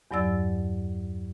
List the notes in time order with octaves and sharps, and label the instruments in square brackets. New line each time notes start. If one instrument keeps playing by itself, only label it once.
[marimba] E2 G2 F#3 D5 E6 A6